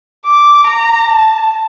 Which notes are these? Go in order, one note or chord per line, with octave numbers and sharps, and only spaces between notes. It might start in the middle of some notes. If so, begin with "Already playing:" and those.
D6
A#5
A5